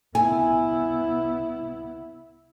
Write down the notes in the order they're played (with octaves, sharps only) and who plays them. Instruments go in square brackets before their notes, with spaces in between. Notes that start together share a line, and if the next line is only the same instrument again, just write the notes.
[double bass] B3 E4 [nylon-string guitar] G#5